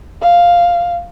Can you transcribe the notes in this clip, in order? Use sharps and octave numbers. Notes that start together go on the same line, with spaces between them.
F5